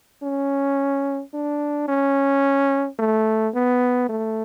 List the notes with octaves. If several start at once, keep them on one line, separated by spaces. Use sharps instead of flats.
C#4
D4
C#4
A3
B3
A3